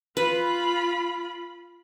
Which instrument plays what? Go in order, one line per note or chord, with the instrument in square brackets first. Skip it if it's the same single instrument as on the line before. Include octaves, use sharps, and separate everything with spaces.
[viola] F4 B5 [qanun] B4